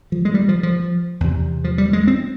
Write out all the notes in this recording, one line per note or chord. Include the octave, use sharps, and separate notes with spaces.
F3
G#3
G3
F3
F3
E2 C3
F3
G3
G#3
C4